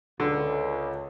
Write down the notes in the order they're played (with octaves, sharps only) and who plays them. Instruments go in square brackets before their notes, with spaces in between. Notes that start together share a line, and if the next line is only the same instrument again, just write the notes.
[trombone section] C#2 [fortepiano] D3